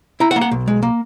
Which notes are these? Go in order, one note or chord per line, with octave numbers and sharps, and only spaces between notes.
E4 A#5
F#5
A#3
F#5
B1
G#3
A#3